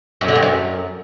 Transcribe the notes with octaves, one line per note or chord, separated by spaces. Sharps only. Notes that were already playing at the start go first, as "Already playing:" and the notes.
F#2
D3
G2
F#2